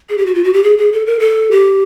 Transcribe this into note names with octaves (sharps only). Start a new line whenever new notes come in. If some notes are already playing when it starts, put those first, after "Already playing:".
G#4
G4
F#4
F4
F#4
G4
G#4
G#4
A4
A#4
A4
G4